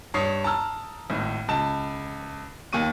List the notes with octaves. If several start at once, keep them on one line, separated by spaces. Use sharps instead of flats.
G2 C#5 D#6 C7
A5 A#5 E6 F6
G#1 A2
C#2 A5 E7
D#2 A#3 C#6 D#7